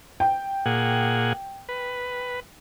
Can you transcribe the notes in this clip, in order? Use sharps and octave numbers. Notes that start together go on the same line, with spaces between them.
G5
A#2 G#4 F#5
B4